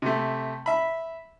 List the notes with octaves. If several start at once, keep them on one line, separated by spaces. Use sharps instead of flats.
C3 A3
E5 B5